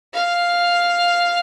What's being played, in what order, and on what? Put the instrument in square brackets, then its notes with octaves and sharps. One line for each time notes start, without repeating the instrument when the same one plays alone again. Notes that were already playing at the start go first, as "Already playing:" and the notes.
[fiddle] F5